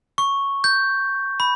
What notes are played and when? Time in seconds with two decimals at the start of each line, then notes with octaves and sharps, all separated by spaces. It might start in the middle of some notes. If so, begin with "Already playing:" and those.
0.18 C#6
0.64 G6
1.40 B5